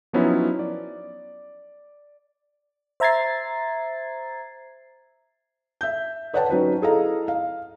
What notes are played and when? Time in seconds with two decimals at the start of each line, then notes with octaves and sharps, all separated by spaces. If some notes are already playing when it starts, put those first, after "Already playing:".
0.13 F3 F#3 B3 C#4 D#4 E4
0.59 D5
3.00 C5 E5 A#5 G#6 A6 C7
5.81 E5 G6
6.33 B4 C#5 D5 F#5 G5 A5
6.50 F#3 C#4 D#4 F#4 B4 C5
6.82 E4 G#4 A4 D#5 F5 A#5
7.28 F5